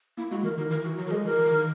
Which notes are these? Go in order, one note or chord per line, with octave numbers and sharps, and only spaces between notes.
A#3 E4
G#3 F#4
E3 A#4
D#3 A#4
E3 A#4
E3 F#4
F#3 F#4
A#4
G#3 G#4
E3 A#4
E3
D#3